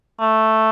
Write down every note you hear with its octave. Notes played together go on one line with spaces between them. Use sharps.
A3